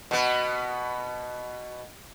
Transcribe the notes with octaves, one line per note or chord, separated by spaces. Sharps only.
B2 B3